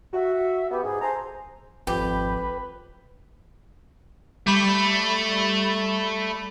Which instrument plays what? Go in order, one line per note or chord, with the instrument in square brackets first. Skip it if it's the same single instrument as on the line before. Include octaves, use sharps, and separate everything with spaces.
[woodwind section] F#4 [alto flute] E5
[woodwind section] B3 [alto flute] G4
[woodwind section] G#2 [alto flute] G#4
[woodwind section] A4 G#5 A#5 [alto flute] C5
[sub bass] G#1 [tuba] F2 [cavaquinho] G4 [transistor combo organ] B4
[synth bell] G3 B5 [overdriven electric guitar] A3